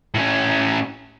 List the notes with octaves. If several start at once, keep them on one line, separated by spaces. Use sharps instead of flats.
A2 C#4